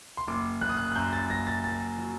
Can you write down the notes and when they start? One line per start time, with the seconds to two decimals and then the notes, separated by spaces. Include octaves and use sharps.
0.17 C6
0.27 F#1 D6
0.61 F#1 F#6
0.69 D#6
0.77 F#6
0.92 F#6
0.95 F#2 G6
1.13 A6
1.30 F#1 A#6
1.47 A6
1.64 F#1 A6
1.98 F#3